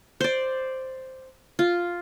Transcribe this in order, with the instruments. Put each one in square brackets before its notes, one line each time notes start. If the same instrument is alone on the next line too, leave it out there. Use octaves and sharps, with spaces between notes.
[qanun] C5 D5
F4